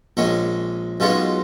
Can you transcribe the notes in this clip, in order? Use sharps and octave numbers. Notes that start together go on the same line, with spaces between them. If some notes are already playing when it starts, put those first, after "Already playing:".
A#1 A#2 G#3 C#4
B1 B2 G#3 C#4 F4